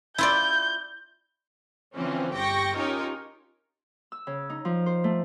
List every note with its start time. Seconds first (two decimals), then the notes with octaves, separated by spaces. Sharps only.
0.18 E4 F4 D5 G6
1.95 D3 E3 F3 C4 C#4
2.32 G1 G4 G5 C#6 A#6
2.74 C#4 D#4 F4 G4 A#4 C#5
4.12 E6
4.27 C#3
4.50 D#4
4.65 F3
4.86 C5
5.04 A3